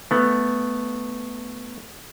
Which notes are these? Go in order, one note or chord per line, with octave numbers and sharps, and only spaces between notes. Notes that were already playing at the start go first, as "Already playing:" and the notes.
A3 B3